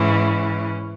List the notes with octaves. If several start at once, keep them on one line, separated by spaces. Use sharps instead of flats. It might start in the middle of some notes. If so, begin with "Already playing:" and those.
Already playing: G#2 E3 C#4